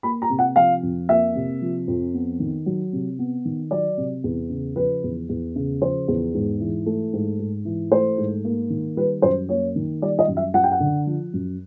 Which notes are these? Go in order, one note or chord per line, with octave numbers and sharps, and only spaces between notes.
A#3 B5
A#5
C3
F#5
F3 F5
F2
A#3 E5
C3
F3
F2
B3
D#3
F#3
C3
B3
D#3
F#3 D5
C3
E2
C#3
F3 B4
E2
E2
C#3
F3 C5
E2
G#2
E3
A3
G#2
G#2
E3
A3 C5
G#2
A#3
D#3
G3 B4
F#2 C5
A#3 C#5
D#3
G3 D5
D#5
F#2
E5
F#2 F#5
G5
F#5
D3
F3
F#2